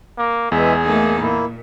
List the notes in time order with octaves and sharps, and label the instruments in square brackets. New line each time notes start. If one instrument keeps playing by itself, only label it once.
[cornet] A#3
[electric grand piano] E2 [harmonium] E3 G#3 E5 [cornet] G#4
[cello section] A3 D#4 A4 [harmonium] A#3
[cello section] A#2 [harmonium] A#3 E4